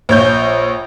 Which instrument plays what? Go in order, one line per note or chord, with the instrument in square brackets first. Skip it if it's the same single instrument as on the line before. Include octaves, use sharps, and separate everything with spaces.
[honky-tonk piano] A#1 C#5 G6